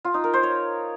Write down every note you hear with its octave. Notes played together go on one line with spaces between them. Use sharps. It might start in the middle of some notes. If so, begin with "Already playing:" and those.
F4
D#4
A#4
C5
C#5